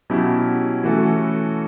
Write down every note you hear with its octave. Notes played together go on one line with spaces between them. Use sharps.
B2 F#3 C#4 E4 G4
E3 A3 C#4 F#4 A4